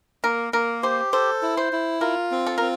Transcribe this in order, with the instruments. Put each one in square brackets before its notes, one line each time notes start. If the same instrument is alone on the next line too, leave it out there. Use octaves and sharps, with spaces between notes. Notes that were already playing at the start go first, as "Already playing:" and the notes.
[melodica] A#3 [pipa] A#4
[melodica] A#3 [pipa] A#4
[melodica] G4 [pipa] C5
[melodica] A4 [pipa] C5
[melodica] E4
[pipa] C5
[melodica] E4
[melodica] F4 [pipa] A#4
[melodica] C4
[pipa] A4
[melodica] C4 [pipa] A#4